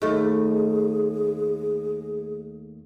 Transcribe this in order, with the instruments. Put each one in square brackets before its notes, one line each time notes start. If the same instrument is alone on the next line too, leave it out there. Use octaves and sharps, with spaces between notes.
[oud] D#2 A3 [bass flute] G#4